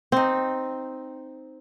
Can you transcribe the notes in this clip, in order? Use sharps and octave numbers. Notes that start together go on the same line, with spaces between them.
C4 D#4